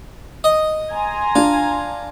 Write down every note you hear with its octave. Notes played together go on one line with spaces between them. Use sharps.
D#5
G#5 A#5 C6
D4 F4